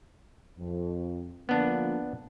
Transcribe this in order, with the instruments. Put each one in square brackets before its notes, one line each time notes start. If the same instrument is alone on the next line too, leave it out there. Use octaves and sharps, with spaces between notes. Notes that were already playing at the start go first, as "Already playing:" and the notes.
[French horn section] F2
[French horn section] D3 F3 A#3 [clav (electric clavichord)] B3 D4